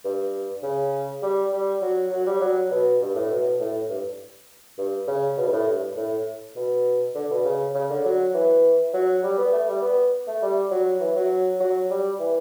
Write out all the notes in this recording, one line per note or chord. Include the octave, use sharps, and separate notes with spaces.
G2
C#3
G3
G3
F#3
F#3
G3
F#3
B2
G2
A2
B2
A2
G2
G2
C#3
B2
G2
A2
G2
A2
B2
D3
B2
C#3
C#3
D3
F#3
E3
F#3
G3
B3
A3
G3
B3
A3
G3
F#3
E3
F#3
F#3
G3
E3